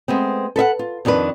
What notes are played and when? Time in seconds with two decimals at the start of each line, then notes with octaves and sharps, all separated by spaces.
0.08 G#3 A3 B3 C4
0.56 A4 B4 E5 F#5
0.79 F4
1.05 F2 D#3 D4 F#4 B4